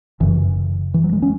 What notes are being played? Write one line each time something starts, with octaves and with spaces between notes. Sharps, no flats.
F#1 F#2 C#3 E3
E3
F#3
G#3
C#4